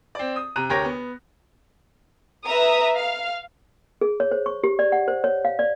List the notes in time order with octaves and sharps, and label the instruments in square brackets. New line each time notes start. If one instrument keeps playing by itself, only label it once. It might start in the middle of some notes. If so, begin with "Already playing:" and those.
[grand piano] C4 D5
D#6
C3 A#5 F#6 D#7
D2 G4 A#4 C#5 A#6
B3
[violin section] B4 E5 A#5 D#6
F5
[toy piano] G#4
C#5
C5
C#6
G4
D5
F#5
C5
C#5
F5
D5